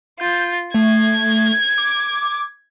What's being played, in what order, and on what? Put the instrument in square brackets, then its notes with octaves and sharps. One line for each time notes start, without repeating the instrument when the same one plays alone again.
[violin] F4 [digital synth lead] G6
[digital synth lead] A3 [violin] G#6
[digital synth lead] D6